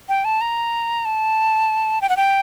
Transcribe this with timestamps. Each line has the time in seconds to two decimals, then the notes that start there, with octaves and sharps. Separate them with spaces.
0.09 G5
0.25 A5
0.41 A#5
1.05 A5
2.02 G5
2.09 F#5
2.17 G5